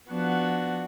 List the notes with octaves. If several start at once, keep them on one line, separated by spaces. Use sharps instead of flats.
F3 B3 D4 F#4